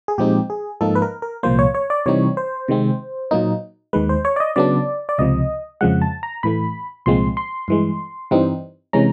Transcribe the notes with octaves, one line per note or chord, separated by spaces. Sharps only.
G#4
A#2 F3 G#3 C4 D#4 G4
G#4
G#2 F3 A#3 D#4 A4
B4
A#4
A#4
C2 A#2 F3 A#3 C5
C#5
C#5
D5
C3 E3 G3 C4 D#4 C#5
C5
C3 D#3 G#3 C4
A#2 F#3 A#3 D#4
D#2 D#3 G#3 B4
C5
C#5
D5
D#5
C#3 F#3 B3 D4 D5
D5
C#2 C3 F3 D#5
F2 C#3 F3 G#3 F#5
A5
A#5
A2 E3 A3 B5
C2 A#2 F3 G#3 C4 C6
C6
G2 E3 G#3
G2 E3 G3 C4 D#4
C3 E3 G#3 C#4 A#5